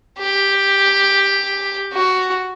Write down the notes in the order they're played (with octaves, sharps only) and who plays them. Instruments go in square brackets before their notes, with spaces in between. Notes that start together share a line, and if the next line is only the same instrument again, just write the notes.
[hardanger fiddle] G4
F#4